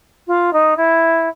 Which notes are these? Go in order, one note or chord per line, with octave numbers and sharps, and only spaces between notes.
F4
D#4
E4